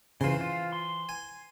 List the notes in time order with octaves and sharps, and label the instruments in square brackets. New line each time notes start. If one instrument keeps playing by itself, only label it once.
[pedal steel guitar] C#3 F4 [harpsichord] E3 C5
[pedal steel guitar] F4
C6
[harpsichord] G#5